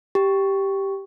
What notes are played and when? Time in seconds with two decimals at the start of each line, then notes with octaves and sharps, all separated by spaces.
0.15 G4